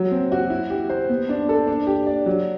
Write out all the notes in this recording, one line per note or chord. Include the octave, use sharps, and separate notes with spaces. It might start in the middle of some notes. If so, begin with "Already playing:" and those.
Already playing: F#3
C4
F#4
E4
G4
C5
B3
D4
A4
D4
G4
D5
F#3